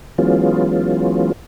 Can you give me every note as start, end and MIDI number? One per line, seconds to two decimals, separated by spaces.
0.18 1.32 52
0.18 1.32 54
0.18 1.32 56
0.18 1.32 59
0.18 1.32 61
0.18 1.32 65